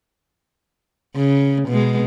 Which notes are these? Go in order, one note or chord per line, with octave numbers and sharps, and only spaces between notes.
C#3
B2 G#3